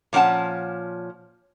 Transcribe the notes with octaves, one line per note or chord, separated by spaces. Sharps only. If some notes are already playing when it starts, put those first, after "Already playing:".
A#2 F3 C#4 F#5 A5